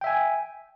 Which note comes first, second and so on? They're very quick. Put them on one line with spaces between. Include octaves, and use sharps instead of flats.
G5 E5 G#5